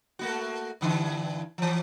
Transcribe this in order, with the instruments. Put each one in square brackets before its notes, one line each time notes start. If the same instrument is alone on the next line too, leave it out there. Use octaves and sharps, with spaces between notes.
[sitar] A3 A#3 F#4
G2 D3 E3
E3 F3